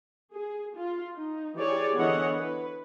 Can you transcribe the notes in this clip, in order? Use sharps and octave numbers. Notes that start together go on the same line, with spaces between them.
G#4
F4
D#4
E3 G4 G#4 C#5 D5
D3 E3 B3 C#5 D#5 F#5
B4